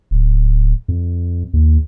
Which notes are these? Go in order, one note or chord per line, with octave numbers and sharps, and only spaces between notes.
D1
F2
D#2